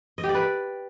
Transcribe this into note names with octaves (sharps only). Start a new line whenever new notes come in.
D#5
G4
D5
B4